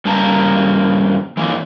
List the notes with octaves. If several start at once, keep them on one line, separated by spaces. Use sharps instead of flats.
G2 C#3 G3 A#3 A5 A#5
E3 F3 A#3